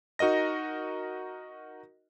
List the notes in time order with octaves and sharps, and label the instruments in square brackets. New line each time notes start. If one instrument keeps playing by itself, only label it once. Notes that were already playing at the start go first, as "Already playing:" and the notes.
[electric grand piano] D#4 F#4 A#4 D#5 A#6